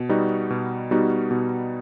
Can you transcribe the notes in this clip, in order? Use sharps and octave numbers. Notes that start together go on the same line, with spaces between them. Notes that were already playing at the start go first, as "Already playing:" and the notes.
Already playing: B2
G3 B3 D#4 F#4
B2
G3 B3 D#4 F#4
B2